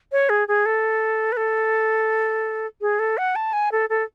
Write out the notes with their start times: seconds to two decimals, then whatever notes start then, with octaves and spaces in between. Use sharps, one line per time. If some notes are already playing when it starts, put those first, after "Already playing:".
0.12 C#5
0.29 G#4
0.48 G#4
0.66 A4
1.32 B4
1.37 A4
2.81 G#4
2.99 A4
3.18 F#5
3.36 A5
3.53 G#5
3.72 A4
3.89 A4